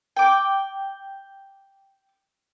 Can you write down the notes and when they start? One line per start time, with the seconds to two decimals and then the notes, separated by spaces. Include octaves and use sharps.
0.17 G5 D6